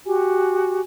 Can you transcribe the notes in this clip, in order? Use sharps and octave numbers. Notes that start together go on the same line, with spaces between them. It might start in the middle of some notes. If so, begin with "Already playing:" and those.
F#4 G4 G#5